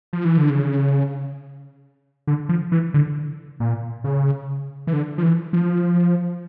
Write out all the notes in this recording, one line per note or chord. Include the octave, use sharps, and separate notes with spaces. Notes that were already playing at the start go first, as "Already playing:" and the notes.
F3
E3
D3
C#3
D3
F3
E3
D3
A#2
C#3
E3
D3
F3
E3
F3